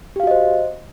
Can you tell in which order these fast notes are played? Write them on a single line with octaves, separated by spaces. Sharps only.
G4 F5 F#4 D#5 C5